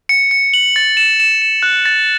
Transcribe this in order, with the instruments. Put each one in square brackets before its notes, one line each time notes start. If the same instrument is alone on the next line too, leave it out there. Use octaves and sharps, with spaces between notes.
[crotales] C#7
C#7
F#7
A6
E7
E7
E7
F#6
A6